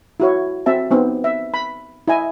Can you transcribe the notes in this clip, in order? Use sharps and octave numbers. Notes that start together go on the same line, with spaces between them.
E4 F#4 C#5
C4 F#4 E5 A5
B3 C4 D#4
E5
B5
E4 D#5 G#5